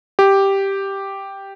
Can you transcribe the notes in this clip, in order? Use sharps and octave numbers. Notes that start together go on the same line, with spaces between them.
G4